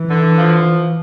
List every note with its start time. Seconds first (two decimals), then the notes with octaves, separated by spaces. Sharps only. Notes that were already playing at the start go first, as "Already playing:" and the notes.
Already playing: E3
0.10 D3
0.37 F3